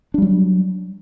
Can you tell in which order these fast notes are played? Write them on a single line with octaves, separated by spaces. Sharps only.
D4 G3 F#3